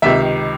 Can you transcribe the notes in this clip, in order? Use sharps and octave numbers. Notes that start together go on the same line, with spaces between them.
C#2 C3 D#3 E5